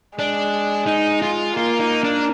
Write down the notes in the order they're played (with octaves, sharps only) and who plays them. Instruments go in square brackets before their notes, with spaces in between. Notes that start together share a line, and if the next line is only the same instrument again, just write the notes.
[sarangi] G#3 [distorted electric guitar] D4
[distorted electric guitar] D#4
F4
[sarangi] A#3 [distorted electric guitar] F4
[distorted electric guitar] D#4
D4